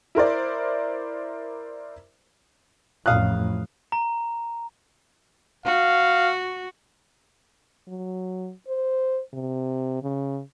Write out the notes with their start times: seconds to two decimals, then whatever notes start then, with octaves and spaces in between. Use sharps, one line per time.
0.15 E4 A#4 C5 D5
3.06 A1 F2 A2 F5 D#6 F#6
3.92 A#5
5.66 F#4 F5
7.88 F#3
8.68 C5
9.33 C3
10.03 C#3